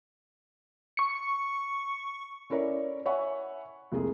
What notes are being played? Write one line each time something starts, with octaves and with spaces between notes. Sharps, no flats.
C#6 C#7
C#4 E4 A4 A#4 C#5 D5
C#5 E5 F#5 G#5 B5 C#6
C2 F2 G#3 A3 G#4